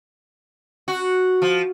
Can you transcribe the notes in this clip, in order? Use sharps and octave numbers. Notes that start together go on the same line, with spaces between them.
F#4
F3